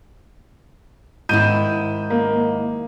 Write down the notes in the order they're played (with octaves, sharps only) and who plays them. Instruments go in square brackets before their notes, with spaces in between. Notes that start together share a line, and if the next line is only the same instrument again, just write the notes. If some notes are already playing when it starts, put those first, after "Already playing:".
[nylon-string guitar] G#2 D#3 E4 [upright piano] G6 D#7
[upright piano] A#3